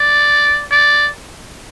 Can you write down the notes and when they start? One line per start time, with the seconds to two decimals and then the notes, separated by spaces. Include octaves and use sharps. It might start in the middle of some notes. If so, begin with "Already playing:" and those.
Already playing: D5
0.71 D5